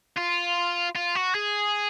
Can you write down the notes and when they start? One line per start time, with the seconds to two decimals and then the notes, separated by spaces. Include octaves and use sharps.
0.17 F4
0.95 F4
1.15 F#4
1.35 G#4